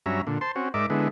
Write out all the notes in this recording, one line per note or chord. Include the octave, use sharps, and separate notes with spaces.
G2 F#3 C#4 E5 A#5
A#2 D3
C5 A5 C6
C4 C#4 F#4
G#2 D#4 A#4 D5 E5 D6
D3 G#3 B3 E4